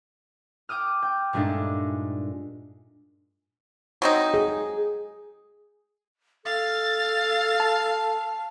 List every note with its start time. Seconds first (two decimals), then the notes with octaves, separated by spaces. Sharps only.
0.69 G5 D6 D#6 F6
1.02 G5
1.33 G2 A#2 G#3 A3 D4 D#4
4.02 F#3 C4 D#4
4.34 G#4
6.45 A4 F5 A6
7.60 A5